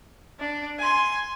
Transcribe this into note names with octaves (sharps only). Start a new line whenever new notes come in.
D4
G#5 C6